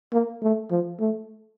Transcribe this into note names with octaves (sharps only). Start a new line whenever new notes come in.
A#3
A3
F3
A3